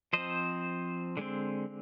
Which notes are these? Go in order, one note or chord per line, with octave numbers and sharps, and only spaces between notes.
F3 C4 C5 D#5
D3 G#3 C4